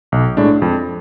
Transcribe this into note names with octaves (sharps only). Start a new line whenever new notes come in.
B1
A2 G#3 D4
F2